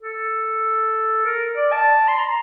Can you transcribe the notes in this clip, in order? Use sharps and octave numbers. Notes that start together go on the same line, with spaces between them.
A4
A#4
D5
A5
C6
A#5